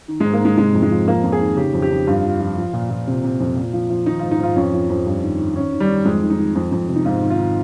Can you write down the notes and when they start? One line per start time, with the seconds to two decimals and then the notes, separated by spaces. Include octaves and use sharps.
0.08 D#3
0.20 G#2 G#3
0.33 A#3
0.41 G#2 G#3
0.58 C3 G#3
0.74 F2
0.82 G#3
0.91 F3
1.07 F2 A#3
1.24 F2
1.32 G#4
1.41 D#3
1.57 C#3 G4
1.73 F2
1.82 G4
1.91 F2
2.07 G2 F4
2.24 F3
2.40 F3
2.57 F3
2.73 A#2
2.90 A#2
3.07 C3
3.24 C3
3.40 F2
3.56 A#2
3.73 F3
3.90 F3
4.06 D#3 D#4
4.19 G#2 F4
4.31 D#4
4.40 G#2 F4
4.56 F2 C#4
4.73 F3
4.90 F2
5.06 G2
5.23 D#3
5.39 D#3
5.55 D#3 C#4
5.73 D#3
5.80 G3
5.89 D#3
6.05 F2 G#3
6.22 D#3
6.30 D#4
6.39 D#3
6.55 F2
6.72 F2
6.88 C3
6.96 D#4
7.05 G#2 F4
7.22 D#3
7.30 F4
7.38 D#3